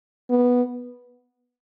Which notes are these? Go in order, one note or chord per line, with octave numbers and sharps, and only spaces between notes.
B3